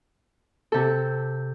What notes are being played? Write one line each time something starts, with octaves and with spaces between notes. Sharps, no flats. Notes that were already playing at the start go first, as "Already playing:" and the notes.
C3 A4